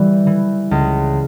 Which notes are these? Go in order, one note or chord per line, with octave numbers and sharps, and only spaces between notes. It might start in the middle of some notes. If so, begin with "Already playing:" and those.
Already playing: E3 G3
E3
C#2